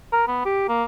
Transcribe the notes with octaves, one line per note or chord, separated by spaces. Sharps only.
A#4
B3
G4
A#3